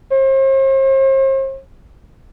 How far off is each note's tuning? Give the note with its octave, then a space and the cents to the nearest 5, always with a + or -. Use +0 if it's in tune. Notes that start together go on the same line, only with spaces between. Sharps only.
C5 +45